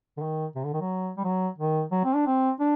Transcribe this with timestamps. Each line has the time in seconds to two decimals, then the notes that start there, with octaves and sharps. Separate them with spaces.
0.17 D3
0.22 D#3
0.56 C3
0.64 D3
0.73 D#3
0.81 F#3
1.17 G3
1.24 F#3
1.58 D#3
1.92 F#3
2.04 C4
2.15 D4
2.27 C4
2.60 D4